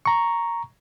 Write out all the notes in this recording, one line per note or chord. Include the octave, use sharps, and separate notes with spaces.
A#5 C#6